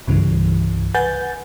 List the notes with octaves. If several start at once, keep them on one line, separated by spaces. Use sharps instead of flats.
C2 G2 C#3 E3
B4 F#5 G#5 G6 A6